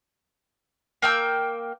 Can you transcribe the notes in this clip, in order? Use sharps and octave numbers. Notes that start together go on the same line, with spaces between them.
A#3 G5 E6